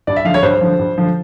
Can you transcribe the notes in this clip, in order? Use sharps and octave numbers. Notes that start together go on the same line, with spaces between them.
G2 D5
E5
D3 F3 F5
C#5
G2 C5
D3 F3
G2
D3 F3